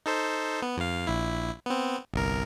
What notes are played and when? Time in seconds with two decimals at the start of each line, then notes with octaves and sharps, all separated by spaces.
0.06 D#4 A4 C5
0.62 B3
0.77 F2 F5
1.07 A#1 E4
1.66 B3 C4
2.14 G1 C2 A#4